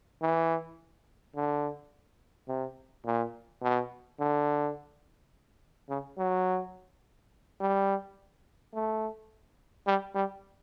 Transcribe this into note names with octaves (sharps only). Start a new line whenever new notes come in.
E3
D3
C3
A#2
B2
D3
C#3
F#3
G3
A3
G3
G3